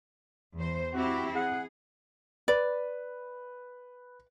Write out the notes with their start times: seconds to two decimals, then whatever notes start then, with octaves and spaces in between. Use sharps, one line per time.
0.55 E2 C5
0.93 C4 E4 F#4 G4
1.35 G#4 F#5
2.48 B4 D5